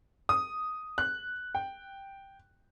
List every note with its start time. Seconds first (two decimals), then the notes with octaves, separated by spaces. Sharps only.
0.29 D#6
0.98 F#6
1.55 G5